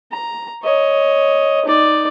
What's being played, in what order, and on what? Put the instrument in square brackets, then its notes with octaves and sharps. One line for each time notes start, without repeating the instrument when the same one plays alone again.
[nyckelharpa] A#5
C#5 D#5
D#4 D5